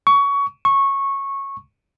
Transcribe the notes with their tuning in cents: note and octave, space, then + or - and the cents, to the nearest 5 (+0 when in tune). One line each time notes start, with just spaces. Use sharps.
C#6 +20
C#6 -15